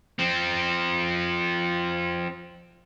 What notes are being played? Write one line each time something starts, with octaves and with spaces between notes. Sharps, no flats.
F3 C4